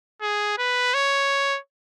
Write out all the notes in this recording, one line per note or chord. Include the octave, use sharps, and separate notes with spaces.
G#4
B4
C#5